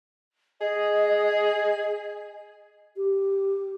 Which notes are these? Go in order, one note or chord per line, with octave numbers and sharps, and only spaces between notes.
G#4 D#5
G4